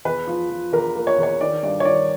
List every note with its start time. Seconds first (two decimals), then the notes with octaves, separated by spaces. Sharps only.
0.05 E2 B4
0.27 F3
0.50 F3
0.72 E2 A#4
0.96 A#3
1.07 C#5
1.18 E2
1.23 C#5
1.41 D#3 D5
1.63 G2 D5
1.80 C#5
1.85 D#3 D5